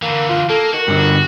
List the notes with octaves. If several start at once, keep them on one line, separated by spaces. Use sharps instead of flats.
D3 E3 A#3
F4
A#3 A4
D#3 F#4
G2 D3